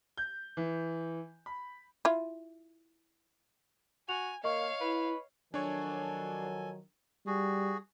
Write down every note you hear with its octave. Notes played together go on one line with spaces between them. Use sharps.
G6
E3
B5
E4 F4
F#4 G#5 F7
A#3 C#5 D#5 F5 C#6
E4 B4
D#3 F3 F#3 D4 A4 C#5 G#5
G3 F#4 G#4